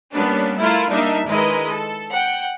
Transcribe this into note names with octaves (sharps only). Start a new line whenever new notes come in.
G3 A#3 B3 C#4 D4
A3 E4 F4 A#4
G3 A#3 D4 D#4 E5
D#3 G#3 E4 A#4 B4 D#5
A4
F#5 G5